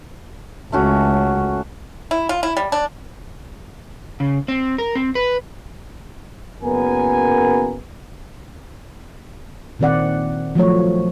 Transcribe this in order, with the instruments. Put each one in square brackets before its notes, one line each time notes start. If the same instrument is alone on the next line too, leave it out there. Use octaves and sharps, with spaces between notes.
[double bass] C#2 [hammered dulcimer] A3 C#4 F#4
[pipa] E4
F4
E4
G3
D4
[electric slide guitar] C#3
C4
A#4
C4
B4
[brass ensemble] F#1 F#2 B3 A#4 G#5
[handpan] A#2 D#3 C4 D5 F#5
F3 F#3 A3 C#5